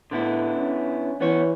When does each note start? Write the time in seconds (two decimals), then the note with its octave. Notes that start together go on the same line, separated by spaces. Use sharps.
0.11 A2 D3 B3 E4
0.56 C#4
1.21 E3 B3 C#5